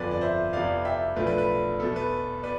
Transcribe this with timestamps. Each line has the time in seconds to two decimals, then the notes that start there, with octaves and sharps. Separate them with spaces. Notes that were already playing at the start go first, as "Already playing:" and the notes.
Already playing: G1 F2 D3 F3 B4 D5
0.11 D5
0.21 C5 E5
0.53 F2 C3 E3 B3 D5 F5
0.85 E5 G5
1.16 B1 A2 F3 A3 D4 B4
1.27 B4
1.38 B4
1.80 E2 B2 B3 A4
1.96 B4
2.43 B3 B4 D5